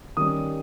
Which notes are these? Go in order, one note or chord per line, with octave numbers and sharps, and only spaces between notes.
D#3 G3 C#4 D#6